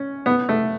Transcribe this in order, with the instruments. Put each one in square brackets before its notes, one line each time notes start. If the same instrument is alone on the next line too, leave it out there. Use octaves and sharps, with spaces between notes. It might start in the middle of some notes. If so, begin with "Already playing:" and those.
Already playing: [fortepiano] C#4
B3
A3